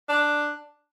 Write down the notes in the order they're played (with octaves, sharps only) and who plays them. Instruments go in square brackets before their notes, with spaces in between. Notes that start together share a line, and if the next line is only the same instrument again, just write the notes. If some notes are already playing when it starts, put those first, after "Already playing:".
[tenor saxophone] D4